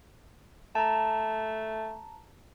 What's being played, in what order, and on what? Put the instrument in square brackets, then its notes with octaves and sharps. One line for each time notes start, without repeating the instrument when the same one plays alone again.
[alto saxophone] A3 [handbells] A5 A#5